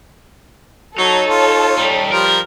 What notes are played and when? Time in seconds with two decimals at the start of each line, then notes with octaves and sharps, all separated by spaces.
0.98 F#3 D#4 A4 C#5
1.30 F4
1.77 G3 D#4
2.12 F3 G3 A#4